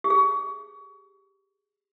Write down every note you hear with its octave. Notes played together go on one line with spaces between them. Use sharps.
G4
G#4